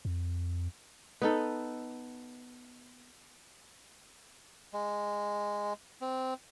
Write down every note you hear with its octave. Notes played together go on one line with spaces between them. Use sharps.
F2
B3 D#4 A4
G#3
C4